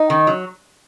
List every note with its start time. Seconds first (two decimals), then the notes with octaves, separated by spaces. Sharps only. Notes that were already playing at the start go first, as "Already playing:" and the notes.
Already playing: D#4
0.10 D#3
0.27 F#3